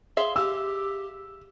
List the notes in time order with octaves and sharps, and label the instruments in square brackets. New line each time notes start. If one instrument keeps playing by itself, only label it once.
[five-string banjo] G#4 E5 F5 [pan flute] C6
[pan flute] G4 [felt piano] E6